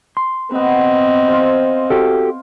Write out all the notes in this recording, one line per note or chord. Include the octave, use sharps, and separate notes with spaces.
C6
B3 C4 B4 D#5
F4 C5
F#4 G4 A4